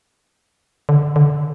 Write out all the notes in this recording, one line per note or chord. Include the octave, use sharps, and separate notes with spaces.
D3
D3